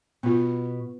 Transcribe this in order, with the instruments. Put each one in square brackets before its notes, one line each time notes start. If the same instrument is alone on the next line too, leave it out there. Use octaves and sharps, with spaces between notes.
[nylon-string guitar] B2 [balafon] B3 F4